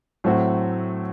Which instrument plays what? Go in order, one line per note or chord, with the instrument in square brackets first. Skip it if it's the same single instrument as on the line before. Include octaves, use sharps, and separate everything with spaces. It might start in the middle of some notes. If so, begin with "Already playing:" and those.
[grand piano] A2 F#3 A3 C4 F#4